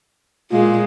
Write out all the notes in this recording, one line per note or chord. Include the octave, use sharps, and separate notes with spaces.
A#2 G#3 A#3 F4